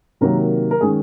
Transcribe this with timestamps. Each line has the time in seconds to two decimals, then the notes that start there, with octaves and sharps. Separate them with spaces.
0.21 C3 D#3 F#3 A#3 A#4
0.71 A#4
0.81 D#3 G#3 C#4 G#4